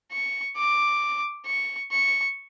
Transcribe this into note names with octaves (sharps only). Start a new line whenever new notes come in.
C#6
D6
C#6
C#6